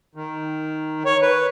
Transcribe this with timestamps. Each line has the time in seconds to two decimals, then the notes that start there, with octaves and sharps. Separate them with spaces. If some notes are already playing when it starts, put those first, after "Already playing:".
0.15 D#3
1.05 C#5
1.22 B4